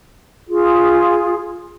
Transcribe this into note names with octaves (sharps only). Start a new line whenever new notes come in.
F4 G#4